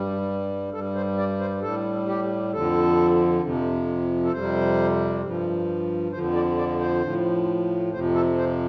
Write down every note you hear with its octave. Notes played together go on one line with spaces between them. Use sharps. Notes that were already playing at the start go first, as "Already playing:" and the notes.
Already playing: G2 G3
G2 G3 A4
C5
D5
C5
A2 G3 A4
G4
F2 D3 F3 A4
F2 C3 F3
A4
F2 C3 G3 C5
G2 F3
F2 D3 F3 C5
D5
D5
C5
A2 F3
F2 C3 F3 C5
A4
C5